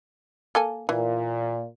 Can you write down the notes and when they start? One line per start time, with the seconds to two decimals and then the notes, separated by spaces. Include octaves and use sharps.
0.55 A#3 A4 G#5
0.89 A#2 E3